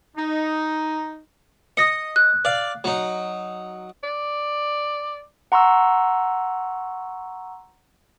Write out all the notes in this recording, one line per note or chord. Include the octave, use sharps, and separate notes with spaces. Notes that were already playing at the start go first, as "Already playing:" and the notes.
D#4
D#5 D#6 A#6 C#7
F#6
D5 F5
F#3 D#4
D5
F#5 A#5 C6 C#6 E6